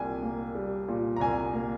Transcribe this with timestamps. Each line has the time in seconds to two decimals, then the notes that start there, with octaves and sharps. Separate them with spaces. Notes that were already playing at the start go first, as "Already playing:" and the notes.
Already playing: C2 A#2 G5 G#5
0.23 A#3
0.55 G3
0.88 A#2
1.16 A#5
1.20 C2 G#5
1.53 A#3